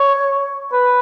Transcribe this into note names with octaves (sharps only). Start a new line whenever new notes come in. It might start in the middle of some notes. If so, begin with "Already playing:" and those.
Already playing: C#5
B4